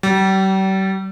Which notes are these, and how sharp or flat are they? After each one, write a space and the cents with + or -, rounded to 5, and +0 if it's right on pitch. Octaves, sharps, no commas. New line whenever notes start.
G3 -40